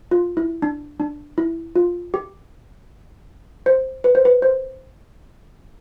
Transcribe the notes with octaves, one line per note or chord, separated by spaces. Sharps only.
F4
E4
D4
D4
E4
F4
G4
C5
B4
C5
B4
C5